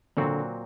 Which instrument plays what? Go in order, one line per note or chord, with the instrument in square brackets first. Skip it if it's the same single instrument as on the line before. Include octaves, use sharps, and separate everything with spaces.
[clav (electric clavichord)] A#2 F#3 C4 F#4 [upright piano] D3